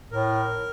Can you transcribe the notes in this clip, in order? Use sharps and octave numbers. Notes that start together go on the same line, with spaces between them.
A2 A#4